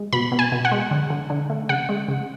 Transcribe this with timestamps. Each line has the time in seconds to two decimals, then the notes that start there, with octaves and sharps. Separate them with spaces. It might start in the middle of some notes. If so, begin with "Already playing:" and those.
Already playing: G#3
0.13 B2 B5
0.32 B2
0.39 G#5
0.52 B2
0.65 F#5
0.72 G#3
0.91 D3
1.10 D3
1.30 D3
1.50 A3
1.69 C#3 F#5
1.89 G#3
2.08 C#3